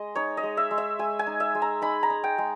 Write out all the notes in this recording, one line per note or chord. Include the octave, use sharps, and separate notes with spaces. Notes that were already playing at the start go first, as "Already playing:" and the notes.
Already playing: G#3 D#5
D#4 C#5
D#5
G#3
E5
G#3
E5
G#3 G#5
G#5
D#4
E5
G#3
A#5
D#4 B5
A#5
D#4
G5
G#3